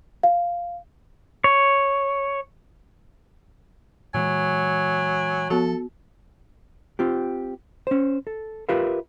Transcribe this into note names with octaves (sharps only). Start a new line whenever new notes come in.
F5
C#5
A#2 E3 F#3 G#3 G#5
F3 B3 F#4 A4
C4 F4 G4
C#4 C5
A4
F4 G4 A#4 B4 E5 F5